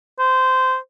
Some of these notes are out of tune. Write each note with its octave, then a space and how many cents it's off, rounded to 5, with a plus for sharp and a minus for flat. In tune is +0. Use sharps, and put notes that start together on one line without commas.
C5 -15